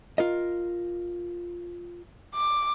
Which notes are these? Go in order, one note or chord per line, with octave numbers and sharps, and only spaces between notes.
F4 A#4 D#5
D6